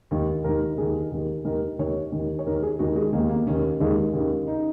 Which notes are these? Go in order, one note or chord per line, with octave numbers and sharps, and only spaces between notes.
D#2 D#3
D#2 D#3 A#4
D#2 D#3 G#4
D#2 D#3
D#2 D#3 A#4
D#2 D#3 C#5
D#2 D#3
C#5
D#2 D#3 A#4
G#4
D#2 D#3 F#4
G#3
D#2 D#3 A#3
A#3
D#2 D#3 C#4
D#2 D#3 G#3
D#2 D#3 C#4
C#3 D#4